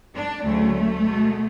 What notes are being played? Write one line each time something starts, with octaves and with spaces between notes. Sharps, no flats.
D4
D2 C#3 F#3 A3
B2 G#3